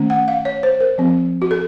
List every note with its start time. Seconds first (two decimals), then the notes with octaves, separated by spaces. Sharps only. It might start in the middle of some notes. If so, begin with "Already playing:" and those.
Already playing: D#3 A3 C#4
0.10 F#5
0.28 F5
0.45 C#5
0.63 C5
0.81 A#4
0.98 F3 C4
1.42 F#4
1.51 A4